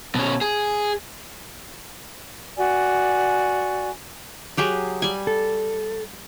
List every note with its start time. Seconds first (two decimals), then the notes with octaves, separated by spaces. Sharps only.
0.15 B2 C#4
0.41 G#4
2.56 F#4 D5 G#5
4.57 F#3 G4 G#4
5.02 G3 G#5
5.27 A4